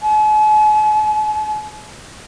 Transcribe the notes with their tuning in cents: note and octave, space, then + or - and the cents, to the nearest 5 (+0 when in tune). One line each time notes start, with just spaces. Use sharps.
G#5 +45